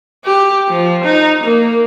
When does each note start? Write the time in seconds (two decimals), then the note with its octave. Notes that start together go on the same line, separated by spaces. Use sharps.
0.25 G4
0.69 F3
1.04 D#4
1.43 A#3